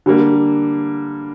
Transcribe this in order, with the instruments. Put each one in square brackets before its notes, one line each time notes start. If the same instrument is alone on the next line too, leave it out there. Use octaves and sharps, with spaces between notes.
[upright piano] D3 G3 A#3